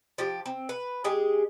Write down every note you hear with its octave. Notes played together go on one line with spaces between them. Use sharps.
F3 G4
C4
B4
G#3 G4 G#4